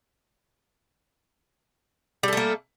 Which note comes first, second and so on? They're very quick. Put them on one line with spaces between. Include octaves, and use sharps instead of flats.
G3 A4 A3 A#3